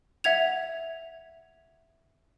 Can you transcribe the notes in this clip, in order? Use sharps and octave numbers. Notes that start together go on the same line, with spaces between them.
E5 F#5 G#6 F7